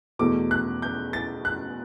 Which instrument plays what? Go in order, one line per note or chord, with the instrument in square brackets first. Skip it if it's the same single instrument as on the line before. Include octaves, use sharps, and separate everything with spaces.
[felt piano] E2 B2 A3 [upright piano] D6
[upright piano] F#6
G6
A6
F#6